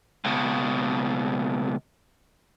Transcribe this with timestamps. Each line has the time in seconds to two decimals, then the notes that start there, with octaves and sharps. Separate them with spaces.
0.25 C#2 B2